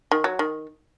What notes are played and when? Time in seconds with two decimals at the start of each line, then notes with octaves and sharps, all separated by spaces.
0.11 D#3
0.24 F#3
0.39 D#3